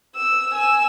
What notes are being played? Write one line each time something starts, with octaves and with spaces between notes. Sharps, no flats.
E6
G#5 E6